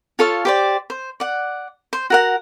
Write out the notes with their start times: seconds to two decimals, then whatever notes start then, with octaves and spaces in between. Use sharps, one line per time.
0.19 F4 A4 C#5 F5
0.45 G4 C5 D5
0.90 C5
1.20 D5 F#5
1.93 C5
2.10 F#4 A#4 F#5